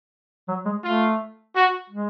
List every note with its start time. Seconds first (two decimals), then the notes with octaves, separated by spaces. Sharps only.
0.48 F#3
0.66 G#3
0.83 A3 F4
1.54 F#4
1.90 G#3